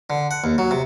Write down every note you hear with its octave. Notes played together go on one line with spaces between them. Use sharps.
D3
F#5
D#2
F#3
C3